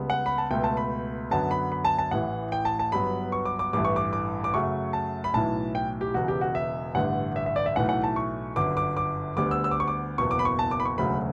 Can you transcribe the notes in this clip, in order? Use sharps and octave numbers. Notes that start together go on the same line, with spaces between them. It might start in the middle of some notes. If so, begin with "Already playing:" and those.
Already playing: C#2 C#3 G3 B3
F#5
B5
A5
C#2 B2 A3 G5
A5
B5
F#2 D3 F#3 B3 A5
B5
B5
A5
A5
A1 A2 E3 F#5
G5
A5
A5
G1 G2 F#3 B3 B5
C#6
D6
D6
A1 G2 E3 A3 D6
C#6
D6
D6
D6
F#2 C#3 F#3 A3 C#6
A5
B5
B1 A2 E3 A5
G5
G4
E1 E2 C#3 F#4
G4
F#4
E5
A1 G2 D3 A3 F#5
E5
E5
D5
E5
B1 A2 E3 A3 F#5
F#5
A5
C#6
G1 F#2 D3 D6
D6
D6
D2 D3 G3 B3 D6
E6
E6
D6
C#6
D6
F#1 E2 B2 C#6
D6
B5
C#6
A5
D6
B5
C#6
E1 D2 C#3 F#3 A3 B5